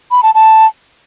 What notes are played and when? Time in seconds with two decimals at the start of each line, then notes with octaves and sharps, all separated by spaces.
0.11 B5
0.23 A5
0.35 A5